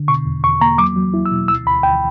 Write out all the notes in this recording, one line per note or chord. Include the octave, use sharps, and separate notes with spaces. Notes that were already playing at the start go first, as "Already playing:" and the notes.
Already playing: D3
B2 C#6
E2
E2 C#6
A#3 A#5
F#3 D6
F#3
E4
E6
B2
D2 E6
D2 B5
D2 G5